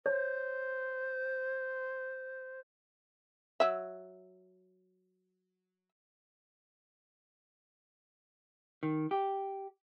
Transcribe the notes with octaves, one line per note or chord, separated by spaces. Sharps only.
C5 C#5
F#3 E5
D#3
G4